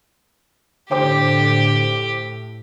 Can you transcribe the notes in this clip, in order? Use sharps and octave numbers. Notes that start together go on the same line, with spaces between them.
A2 D3 G4 C5 G5 D6